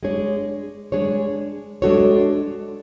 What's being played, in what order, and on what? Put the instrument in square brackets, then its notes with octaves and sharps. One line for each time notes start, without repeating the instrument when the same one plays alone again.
[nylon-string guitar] G#3 D4 G#4 C#5
G#3 D4 G#4 C#5
G#3 D4 F#4 A4 C#5